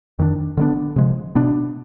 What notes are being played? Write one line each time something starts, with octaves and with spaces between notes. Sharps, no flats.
F2 D#3 B3 D4
D3 G3 B3 D4
C3 F3 G#3
B2 B3 D4